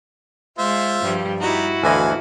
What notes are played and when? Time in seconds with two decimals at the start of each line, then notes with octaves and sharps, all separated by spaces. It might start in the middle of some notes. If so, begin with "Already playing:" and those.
0.58 G#3 F4 C5 E5
1.02 G2 F3 G3
1.41 G3 D#4 E4 F#4
1.84 D2 E3 D#5 F5 G#5